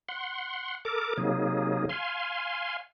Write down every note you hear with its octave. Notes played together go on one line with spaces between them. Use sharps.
F#5 C6
A4 A#4 D6
C3 F#3 A#3 D#4 G#4
F5 G#5 C6